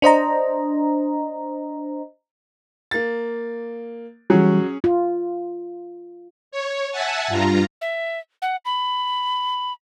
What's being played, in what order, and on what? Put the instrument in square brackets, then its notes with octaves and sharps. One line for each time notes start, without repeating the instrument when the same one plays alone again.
[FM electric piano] D4 C5 D#5 A#5
[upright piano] A#3 A6
[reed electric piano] E3 G3 [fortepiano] F#3 [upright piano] C#4 G#4
[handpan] F4
[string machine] C#5
E5 F#5 G#5 A5
G2 F4 A#5
[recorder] E5
F#5
B5